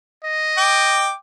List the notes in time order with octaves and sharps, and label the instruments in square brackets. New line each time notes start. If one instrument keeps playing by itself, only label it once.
[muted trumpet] D#5
[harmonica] G5 D6